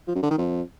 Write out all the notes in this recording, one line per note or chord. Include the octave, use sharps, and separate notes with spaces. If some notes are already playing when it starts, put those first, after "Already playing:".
F3
F#2
D3
D#3
F2